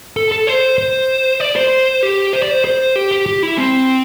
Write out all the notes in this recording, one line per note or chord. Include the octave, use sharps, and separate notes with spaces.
A4
A4
C5
C5
D5
C5
G4
C5
D5
C5
C5
G4
G4
G4
E4
C4